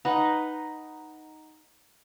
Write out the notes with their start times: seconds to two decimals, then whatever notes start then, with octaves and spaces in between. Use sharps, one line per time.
0.05 D#4 B4 F#5